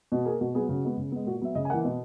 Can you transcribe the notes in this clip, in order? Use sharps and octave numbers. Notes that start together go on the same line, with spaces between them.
B2 F#4
A#3 G#4
B2 F#4
F#3 B3 G#4
C#3 F#4
G#3 B3
C#3
G#3 B3
A#2 F#4
F#3 B3 E5
C#3 D#5
G#5
E3 A#3 F#5
B2